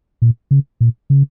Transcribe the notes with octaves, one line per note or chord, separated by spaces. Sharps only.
A#2
C#3
A#2
C#3